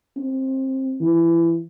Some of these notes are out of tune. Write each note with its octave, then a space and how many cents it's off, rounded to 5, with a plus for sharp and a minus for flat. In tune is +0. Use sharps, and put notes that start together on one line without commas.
C4 +20
E3 +20